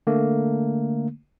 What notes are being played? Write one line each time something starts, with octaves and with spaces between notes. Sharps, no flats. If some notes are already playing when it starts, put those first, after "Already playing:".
D3 A3 A#3